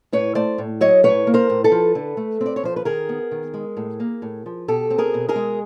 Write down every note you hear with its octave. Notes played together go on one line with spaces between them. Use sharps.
A2 B4 C#5
A3 C5 D5
A2
F#3 C#5 D#5
A2 B4 C#5
A#3
A#4 C5
A2
A4 B4
F3
D3
A3
C4
D5
C#5
F3 C5
B4
D#3 G#4 A#4
B3
D#3
G#3
A2
A#3
A2
F3
B2 G4 A4
C4
G#4 A#4
B2
G#4 A#4
G#3